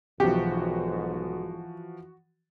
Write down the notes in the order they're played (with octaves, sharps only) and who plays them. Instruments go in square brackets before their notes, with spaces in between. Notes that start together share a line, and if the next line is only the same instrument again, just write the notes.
[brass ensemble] B1 G#2 [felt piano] E3 F3 [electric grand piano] F#4 [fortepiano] G4